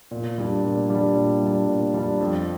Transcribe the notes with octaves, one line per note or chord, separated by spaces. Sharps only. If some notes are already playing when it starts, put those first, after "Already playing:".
A#2
G3 D4
A#2
G3 D4
A#2
G3 D4
A#2
G3 D4
F2